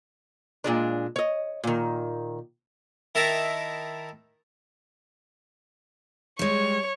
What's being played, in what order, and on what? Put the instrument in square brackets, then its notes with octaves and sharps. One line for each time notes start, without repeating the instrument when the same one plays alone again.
[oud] A#2 G#3 D4
C#5 D#5
A#2 D#3
[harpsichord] D#3 E4 A#4 E5 A5 A#5
[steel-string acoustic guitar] G3 G#3 [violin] C#5